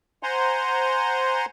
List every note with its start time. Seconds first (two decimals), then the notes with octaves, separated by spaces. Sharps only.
0.23 C5 F#5 G#5 A#5 C6